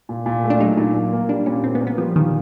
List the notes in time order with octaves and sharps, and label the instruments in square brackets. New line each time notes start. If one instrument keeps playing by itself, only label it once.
[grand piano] A#2
A#2
A3
[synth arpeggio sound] D4
[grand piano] F#3 [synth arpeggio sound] D#4
[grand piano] A#2 [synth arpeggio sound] D#4
[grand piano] A#2
A#3
[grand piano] G3 [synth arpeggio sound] D4
[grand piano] A#2 [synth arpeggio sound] C#4
[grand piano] A#2 [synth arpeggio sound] C4
[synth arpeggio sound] B3
[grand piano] A#3
[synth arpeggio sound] B3
[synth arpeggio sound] F3 [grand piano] G3
[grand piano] A#2 [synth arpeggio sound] D#3